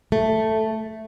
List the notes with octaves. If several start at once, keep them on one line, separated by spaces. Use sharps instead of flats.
A3